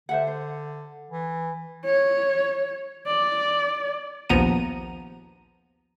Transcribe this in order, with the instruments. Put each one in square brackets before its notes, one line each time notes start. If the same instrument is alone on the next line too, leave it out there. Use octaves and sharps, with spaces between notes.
[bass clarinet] D3 [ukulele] C5 E5 F#5
[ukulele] C5
[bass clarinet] E3
[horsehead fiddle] C#5
D5
[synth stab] A#1 D#2 F3 B3 A#5 D#7